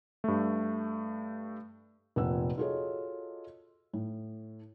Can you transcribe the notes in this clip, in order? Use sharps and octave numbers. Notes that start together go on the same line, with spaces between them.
G2 A3
F1 A#2 C4 F#5 E6
F4 F#4 G#4 A4 C#5 D#5
A2